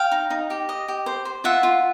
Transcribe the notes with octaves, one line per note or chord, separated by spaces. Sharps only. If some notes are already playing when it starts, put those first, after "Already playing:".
Already playing: F5 G5
D#4
D#4
G4
D#5
G4
C5
C5
F4 E5 F#5
F4